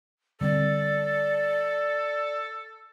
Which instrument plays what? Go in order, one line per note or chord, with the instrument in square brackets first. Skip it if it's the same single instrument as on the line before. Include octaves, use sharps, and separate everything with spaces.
[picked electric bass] D3 G3 C4 [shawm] A4 [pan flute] D5